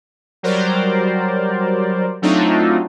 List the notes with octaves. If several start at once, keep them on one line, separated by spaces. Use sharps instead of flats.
F#3 G3 A#4 C5 D5
F#3 A3 C4 D4 D#4 F4